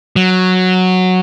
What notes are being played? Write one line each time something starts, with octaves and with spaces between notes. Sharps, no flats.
F#3